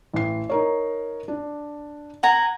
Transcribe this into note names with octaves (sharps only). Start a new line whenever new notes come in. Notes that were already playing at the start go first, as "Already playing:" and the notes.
A1 C7
D#4 A#4 C#5
D4
F#5 G#5 A#5